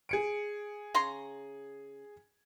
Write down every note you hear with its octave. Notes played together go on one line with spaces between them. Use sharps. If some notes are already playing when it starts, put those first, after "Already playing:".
G#4 C#7 D7
C#3 A#5 C6